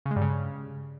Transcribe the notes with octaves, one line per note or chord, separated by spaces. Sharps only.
C#3
G#3
G2
C#3